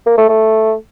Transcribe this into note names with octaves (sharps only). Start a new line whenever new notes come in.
A#3
A3
A3